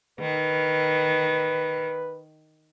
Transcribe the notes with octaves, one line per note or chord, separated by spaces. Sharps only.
D#3 B4